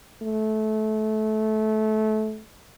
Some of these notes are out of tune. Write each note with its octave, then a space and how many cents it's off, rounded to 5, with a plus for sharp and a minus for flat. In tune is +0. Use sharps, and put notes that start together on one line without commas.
A3 -20